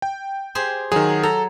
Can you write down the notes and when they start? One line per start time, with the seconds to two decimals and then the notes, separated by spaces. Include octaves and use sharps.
0.02 G5
0.55 G4 G#4 C5
0.92 D#3 F#3 G#4
1.23 A4 A#5